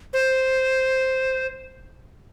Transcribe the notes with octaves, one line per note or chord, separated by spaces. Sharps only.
C5